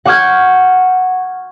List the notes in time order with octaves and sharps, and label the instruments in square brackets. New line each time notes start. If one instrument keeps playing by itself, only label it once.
[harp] F#5 C#6 D6 F6 G6 G#6